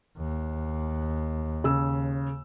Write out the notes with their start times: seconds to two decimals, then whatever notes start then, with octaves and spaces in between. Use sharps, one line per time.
0.17 D#2
1.64 C#3 E6